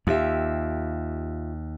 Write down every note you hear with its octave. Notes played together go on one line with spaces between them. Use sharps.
D#2 F4 G4 E5